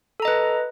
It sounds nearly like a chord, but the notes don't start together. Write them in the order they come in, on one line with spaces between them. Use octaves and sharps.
A4 A#5 D#5 B4